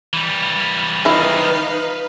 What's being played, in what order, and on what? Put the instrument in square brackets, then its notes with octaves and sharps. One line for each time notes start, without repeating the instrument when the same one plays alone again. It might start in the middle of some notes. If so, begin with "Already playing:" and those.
[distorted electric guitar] E3 G3
[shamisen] D#3 F3 E4 [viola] D#4 F5 [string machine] B4